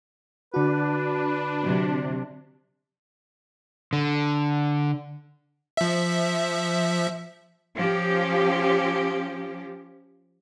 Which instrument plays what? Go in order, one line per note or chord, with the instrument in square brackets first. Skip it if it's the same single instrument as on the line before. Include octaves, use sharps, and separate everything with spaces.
[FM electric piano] D3 F#4 [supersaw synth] D4 [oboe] B4
[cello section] C3 F#3
[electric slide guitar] D3
[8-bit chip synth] F3 E5
[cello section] F3 C#4 G4